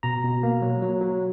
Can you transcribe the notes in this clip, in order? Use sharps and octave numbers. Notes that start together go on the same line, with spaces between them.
B2 A#5
B2
A#3
F#3
F#3
F#3